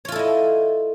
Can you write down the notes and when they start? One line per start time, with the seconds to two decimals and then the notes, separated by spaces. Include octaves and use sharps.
0.05 C#5
0.08 F4
0.12 A4
0.16 E4
0.19 D#5